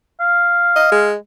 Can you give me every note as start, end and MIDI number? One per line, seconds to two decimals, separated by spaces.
0.20 1.07 77
0.76 0.91 75
0.92 1.15 56